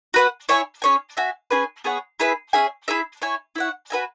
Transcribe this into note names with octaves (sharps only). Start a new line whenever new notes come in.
F#4 B4 F#5
E4 C#5 G#5
C#4 G#4 C#5 G#5
F#4 E5 G#5
C#4 G#4 B4 G#5
B3 G#4 C#5 F#5
E4 G#4 B4 E5
C#4 G#4 E5 G#5
E4 G#4 E5
E4 C#5 G#5
E4 C#5 F#5
F#4 B4 E5 G#5